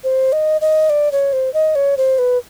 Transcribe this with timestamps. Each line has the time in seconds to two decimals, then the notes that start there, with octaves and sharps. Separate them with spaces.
0.04 C5
0.33 D#5
0.61 D#5
0.90 D5
1.12 C#5
1.33 C5
1.54 D#5
1.75 C#5
1.97 C5
2.19 B4